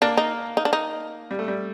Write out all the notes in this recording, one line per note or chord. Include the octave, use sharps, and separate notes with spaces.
A#3 D4
D#4
D#4
D4
D#4
G3
A3
G3